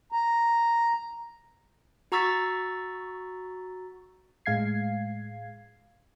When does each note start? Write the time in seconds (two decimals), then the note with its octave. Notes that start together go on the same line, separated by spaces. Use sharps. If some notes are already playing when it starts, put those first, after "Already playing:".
0.12 A#5
2.12 F#4 A#5 C#6 E6 A6 B6
4.46 A2 G#3 F5 G#6 C7